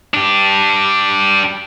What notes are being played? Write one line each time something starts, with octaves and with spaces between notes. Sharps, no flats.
D4 G4